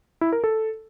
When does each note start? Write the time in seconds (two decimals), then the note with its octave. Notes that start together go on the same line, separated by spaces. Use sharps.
0.21 E4
0.33 A#4
0.44 A4